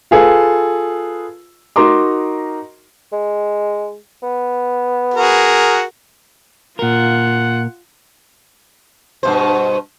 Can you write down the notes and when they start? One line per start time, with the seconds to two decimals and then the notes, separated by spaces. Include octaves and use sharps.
0.11 F4 G#4 A4 B4
1.76 D#4 F#4 A#4 A#5 C6 D6
3.12 G#3
4.23 B3
5.14 F#4 G#4 A#4
6.79 A#2 F4 A#4 F#5
9.23 G2 B2 C5